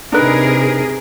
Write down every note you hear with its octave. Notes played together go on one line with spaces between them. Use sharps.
C3 D4 D#4 G#4 A#4 B4